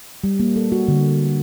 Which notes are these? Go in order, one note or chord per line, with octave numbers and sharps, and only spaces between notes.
G3
A#3
A4
F#4
D3